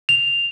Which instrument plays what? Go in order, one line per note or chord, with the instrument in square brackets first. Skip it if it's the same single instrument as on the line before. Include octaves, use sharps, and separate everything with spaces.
[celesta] F7